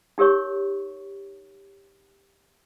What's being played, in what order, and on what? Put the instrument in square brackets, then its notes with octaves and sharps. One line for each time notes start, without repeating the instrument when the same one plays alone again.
[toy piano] D#4 G4 A#4 C#5 C#6